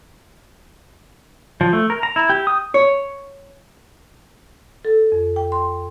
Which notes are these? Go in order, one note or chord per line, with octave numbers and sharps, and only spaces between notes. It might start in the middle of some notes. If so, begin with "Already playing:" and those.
F3
A3
A#4
A#5
E4
G4
D#6
C#5
A4
F2
G5
C6